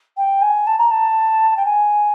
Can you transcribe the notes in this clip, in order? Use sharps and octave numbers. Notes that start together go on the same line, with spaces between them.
G5
G#5
A5
A#5
A5
G5
G#5